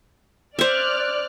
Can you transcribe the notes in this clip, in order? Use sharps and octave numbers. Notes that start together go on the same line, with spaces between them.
C5 D5 E5 F6 F#6